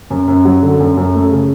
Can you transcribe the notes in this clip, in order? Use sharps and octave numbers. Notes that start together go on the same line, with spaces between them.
F#2
F#2
F#3
D3
F#2
F#2
A3
C#3